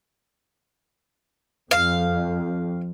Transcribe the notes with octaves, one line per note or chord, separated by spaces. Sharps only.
F2 F5